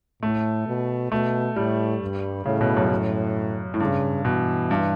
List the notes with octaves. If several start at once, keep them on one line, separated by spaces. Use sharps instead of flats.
A2 A3
B2
B2 A3
A2 G3
G2
A2 C#3
B2
F#2
A2
A2
G2 C#3
B2 E3
G2